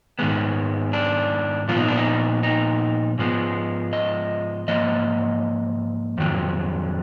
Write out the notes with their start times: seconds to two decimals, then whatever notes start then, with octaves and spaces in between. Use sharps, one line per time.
0.19 G#2 D#3 G#3 B3
0.93 D4
1.68 A#2 F3 B3 F4
1.78 D#4
1.88 D4
1.98 D#4
2.43 D#4
3.18 G#2 F3 G#3 B3
3.93 D#5
4.68 G#2 F3 A#3 D#5
6.18 F2 D#3 F#3